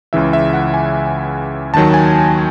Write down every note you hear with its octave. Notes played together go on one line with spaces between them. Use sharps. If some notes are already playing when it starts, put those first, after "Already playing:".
C#2 C#3 E3 E5
E5
F#5
G#5
D#2 D#3 F#3 A5
G#5